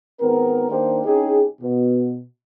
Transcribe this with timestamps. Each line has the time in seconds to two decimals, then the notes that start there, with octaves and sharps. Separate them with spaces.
0.20 G#1 B3 C4 A#4
0.69 D#3 A#3 D4 G4 A#4 C5
1.05 C2 C#4 D#4 G4 G#4
1.61 B2